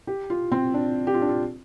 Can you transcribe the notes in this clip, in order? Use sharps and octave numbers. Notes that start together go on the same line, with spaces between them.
G4
F4
C4
D4
G4
F4
D4
F4